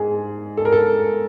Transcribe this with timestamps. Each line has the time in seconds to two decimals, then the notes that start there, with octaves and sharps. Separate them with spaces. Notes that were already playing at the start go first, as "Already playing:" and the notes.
Already playing: G#2 G#4
0.57 A4
0.65 A#4
0.72 A4